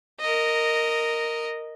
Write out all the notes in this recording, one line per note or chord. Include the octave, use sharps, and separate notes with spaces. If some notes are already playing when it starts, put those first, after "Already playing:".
A#4 D#5